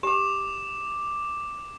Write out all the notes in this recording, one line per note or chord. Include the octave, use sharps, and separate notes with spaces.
G4 D6 E7